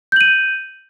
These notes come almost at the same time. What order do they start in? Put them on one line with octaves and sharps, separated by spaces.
G6 F#7 D#7